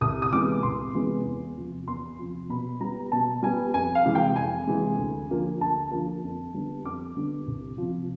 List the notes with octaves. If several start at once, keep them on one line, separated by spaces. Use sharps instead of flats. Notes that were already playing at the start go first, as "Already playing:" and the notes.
C2 D#6
D#6
C3 E3 G#3 B3 D6
C2 C6
C3 E3 G#3 B3
E2
C3 F3
E2 C6
C3 F3
B2 B5
G3 B3 A#5
B2 A5
G3 B3 G#5
F2 G#5
F5
C3 E3 G#3
G5
F2 G#5
C3 E3 G#3
D2
D3 F3 A#3
D2 A5
D3 F3 A#3
F2
D3 G3 B3
F2 D6
D3 G3 B3
C2
C3 F3